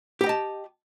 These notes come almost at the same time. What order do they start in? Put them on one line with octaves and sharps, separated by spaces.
G4 G5 D#5 A5